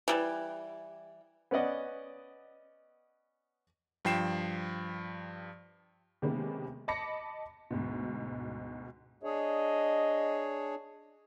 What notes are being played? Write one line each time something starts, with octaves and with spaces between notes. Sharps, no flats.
E3 G3
B3 C#4 B4 D5 D#5 F#5
G2 F3 G5 C7 E7
C3 D#3 G#3 A#3 B3 C#4
D#5 A5 B5 D6 A#6 C#7
D2 G#2 B2
D4 G#4 C#5 D#5